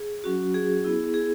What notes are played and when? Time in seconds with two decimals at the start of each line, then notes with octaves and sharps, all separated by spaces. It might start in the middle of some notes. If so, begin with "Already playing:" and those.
Already playing: G#4
0.24 F#3 C#4 F#4
0.54 G#4
0.84 B3 E4
1.14 G#4